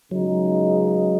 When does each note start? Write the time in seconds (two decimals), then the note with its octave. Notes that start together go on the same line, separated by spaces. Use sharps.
0.11 C#2 C#3 F#3 G#3 D#4